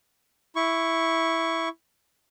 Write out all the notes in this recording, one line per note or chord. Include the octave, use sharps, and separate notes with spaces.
E4 C#6